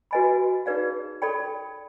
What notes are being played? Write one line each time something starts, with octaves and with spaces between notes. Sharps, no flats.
F#4 B4 D#5 G#5 B5
D#4 G#4 B4 D5 F5
A4 D5 G5 B5